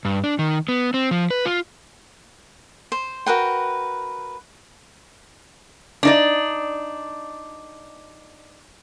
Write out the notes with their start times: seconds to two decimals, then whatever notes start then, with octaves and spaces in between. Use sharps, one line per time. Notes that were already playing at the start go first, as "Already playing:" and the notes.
0.05 G2
0.24 D4
0.39 D#3
0.69 B3
0.94 C4
1.11 F3
1.31 B4
1.45 F4
2.92 C5
3.26 F#4 A#4 B4 G5
6.03 D4 D#4 D5